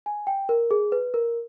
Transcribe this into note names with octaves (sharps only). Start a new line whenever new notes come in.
G#5
G5
A#4
G#4
B4
A#4